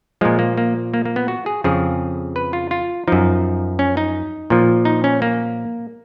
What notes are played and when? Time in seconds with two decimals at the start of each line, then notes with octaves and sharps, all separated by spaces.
0.21 A#2 F3 G#3
0.39 A#3
0.58 A#3
0.94 A#3
1.05 A#3
1.16 B3
1.28 F#4
1.46 G#4
1.64 F2 C#3 F3 G#4
2.36 B4
2.53 F4
2.71 F4
3.08 F#2 F3 D#4
3.79 C#4
3.97 D#4
4.50 A#2 F3
4.85 D#4
5.04 C#4
5.22 A#3